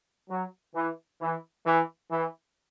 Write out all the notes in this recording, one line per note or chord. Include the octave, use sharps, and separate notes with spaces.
F#3
E3
E3
E3
E3